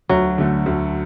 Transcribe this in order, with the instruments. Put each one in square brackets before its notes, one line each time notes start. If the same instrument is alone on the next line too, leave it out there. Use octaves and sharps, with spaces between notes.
[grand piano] D2 [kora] F#3
[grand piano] D3 A3
D2